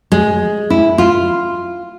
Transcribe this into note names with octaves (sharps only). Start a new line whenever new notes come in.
G#3
E4
F4